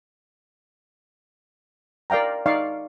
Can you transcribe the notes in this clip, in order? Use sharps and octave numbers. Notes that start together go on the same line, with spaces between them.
A#4 D5 F5 G5 A#5
D#4 D5 F5 C#6